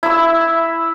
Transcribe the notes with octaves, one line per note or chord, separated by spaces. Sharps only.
E4 E6